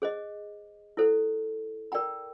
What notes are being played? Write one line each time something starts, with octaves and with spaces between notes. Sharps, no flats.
G#4 C5 D#5
E4 A4 C5
A#4 D5 G5 A#5